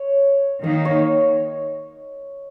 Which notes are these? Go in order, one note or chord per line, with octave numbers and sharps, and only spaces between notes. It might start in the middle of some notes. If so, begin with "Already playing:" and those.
Already playing: C#5
D#3 A#3 D#4 D#5
C#5